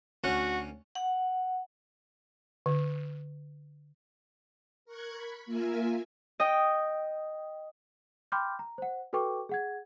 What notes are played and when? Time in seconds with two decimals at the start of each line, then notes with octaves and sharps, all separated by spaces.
0.24 D2 C#4 F#4 F#5
0.95 F#5
2.66 D3
4.85 A#4 C#6 F#6 G#6
5.16 B5
5.46 A#3 F4 A#4 E5 G#5
6.40 D#5 G5
8.32 G5 B5 C6 D6 F6 G6
8.59 A#5
8.78 C5 F#5
9.13 F#4 A4 B4 G5 C#6 D6
9.49 G#4 F#5 G#6